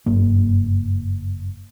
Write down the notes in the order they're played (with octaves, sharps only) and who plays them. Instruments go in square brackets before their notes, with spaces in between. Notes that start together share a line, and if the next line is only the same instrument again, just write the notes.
[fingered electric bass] F#1 G2 A#3